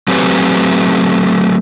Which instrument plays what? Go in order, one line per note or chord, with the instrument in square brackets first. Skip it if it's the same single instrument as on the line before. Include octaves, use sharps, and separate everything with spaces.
[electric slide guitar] F#3 A3 C4 G4 B4 G#5